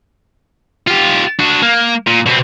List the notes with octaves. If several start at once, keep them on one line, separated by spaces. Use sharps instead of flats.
F4 G4
D4 F#4
A#3
A#2
B2 C4